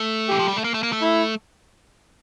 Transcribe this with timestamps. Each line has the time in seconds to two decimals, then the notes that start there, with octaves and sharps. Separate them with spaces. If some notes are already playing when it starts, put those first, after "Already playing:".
Already playing: A3
0.28 E3 G4
0.39 F3
0.48 G3
0.56 A3
0.64 A#3
0.74 A3
0.83 A#3
0.93 A3
1.01 E4